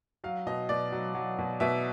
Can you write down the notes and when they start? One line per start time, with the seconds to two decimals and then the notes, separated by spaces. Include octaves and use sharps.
0.24 F#3 F5
0.46 B2 D#5
0.69 B2 D5
0.92 F#3
1.15 F#3
1.38 B2
1.60 B2 E5